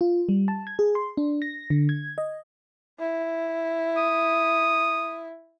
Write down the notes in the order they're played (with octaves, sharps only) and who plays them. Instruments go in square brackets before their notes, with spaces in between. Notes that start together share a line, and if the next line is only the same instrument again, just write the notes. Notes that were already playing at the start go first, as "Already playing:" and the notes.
[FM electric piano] F4
G3
A5
G#6
G#4
C6
D4
A#6
D3
G#6
D#5
[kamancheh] E4
[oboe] D#6